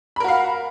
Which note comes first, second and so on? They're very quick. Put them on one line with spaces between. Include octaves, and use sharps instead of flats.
B5 A#4 F#4 F5